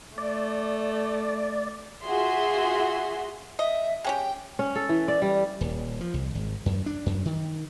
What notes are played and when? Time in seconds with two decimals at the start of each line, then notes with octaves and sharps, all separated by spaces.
0.18 A3 D5
2.05 F4 F#4 G#4 E5 C6
3.59 D#5 E5
4.04 G#3 C#4 G4 G5
4.59 C#4
4.75 A4
4.89 E3
5.08 D5
5.22 G3
5.61 D#1
6.01 F3
6.14 C2
6.35 G#1
6.66 F#2
6.86 D4
7.06 F#2
7.25 D#3